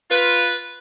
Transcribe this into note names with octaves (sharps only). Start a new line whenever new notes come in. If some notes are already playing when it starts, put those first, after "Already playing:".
F4 B4